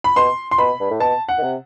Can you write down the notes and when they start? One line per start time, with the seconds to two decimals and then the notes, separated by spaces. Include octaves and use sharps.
0.04 B5
0.16 B2 C6
0.51 C6
0.58 B2 B5
0.80 G2
0.90 A2
1.00 B2 A5
1.29 F#5
1.38 D#3
1.43 C3